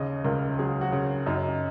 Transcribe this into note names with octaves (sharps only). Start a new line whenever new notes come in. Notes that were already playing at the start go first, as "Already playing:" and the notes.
Already playing: D#2 C#3 D#5
C#2 A#4
F#3 G#4
F#4
C#3
F#2 D#4